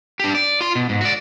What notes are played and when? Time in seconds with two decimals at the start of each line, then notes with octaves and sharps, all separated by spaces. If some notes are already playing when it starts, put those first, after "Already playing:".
0.20 D4 G4
0.35 D5
0.61 F4 C6
0.75 B2
0.89 G#2
1.01 F#4 D5